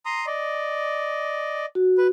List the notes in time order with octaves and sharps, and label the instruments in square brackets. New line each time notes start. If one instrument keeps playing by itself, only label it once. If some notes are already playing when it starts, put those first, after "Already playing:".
[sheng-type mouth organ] A#5 C6 D#6
D5 D#5
[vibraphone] F#4
[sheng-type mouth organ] B4